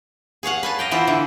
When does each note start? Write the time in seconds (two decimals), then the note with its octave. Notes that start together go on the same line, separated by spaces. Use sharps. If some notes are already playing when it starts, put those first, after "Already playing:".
0.43 G#4 C#5 F5 F#5
0.63 B4 G#5 A5
0.79 D#5 F5 G5
0.91 E3 B3 F4 B4 C5
1.07 D3 E3